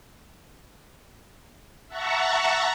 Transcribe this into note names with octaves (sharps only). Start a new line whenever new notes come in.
E5 F#5 A5 A#5 C#6